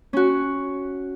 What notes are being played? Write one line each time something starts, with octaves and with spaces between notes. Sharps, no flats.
C#4 F#4